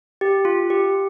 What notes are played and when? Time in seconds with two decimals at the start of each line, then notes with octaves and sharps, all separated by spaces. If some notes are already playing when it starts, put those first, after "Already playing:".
0.21 G4
0.45 F4
0.70 G4